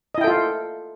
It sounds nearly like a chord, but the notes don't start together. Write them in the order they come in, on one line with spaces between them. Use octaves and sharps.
D#5 E4 G5 A4 F4